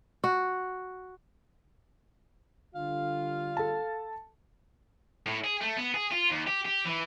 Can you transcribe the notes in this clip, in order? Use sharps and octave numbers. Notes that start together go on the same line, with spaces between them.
F#4
D3 G3 F4 F5
A4 A5
A2
G#4
A3
B3
G#4
F4
D#2
G4
G4
E3